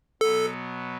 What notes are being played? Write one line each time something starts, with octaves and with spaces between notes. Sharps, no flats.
B2 F#3 B3 A4